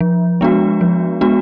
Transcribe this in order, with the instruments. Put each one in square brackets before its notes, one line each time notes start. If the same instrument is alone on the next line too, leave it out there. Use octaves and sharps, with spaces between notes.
[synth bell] F3
G#3 B3 D4 F#4
F3
G#3 B3 D4 F#4